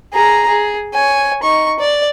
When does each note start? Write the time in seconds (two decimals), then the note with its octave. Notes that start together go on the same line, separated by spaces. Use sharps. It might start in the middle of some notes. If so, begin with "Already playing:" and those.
0.13 G#4 A#5
0.48 G#4
0.94 C#5 G#5
1.43 D#4 C#6
1.79 D5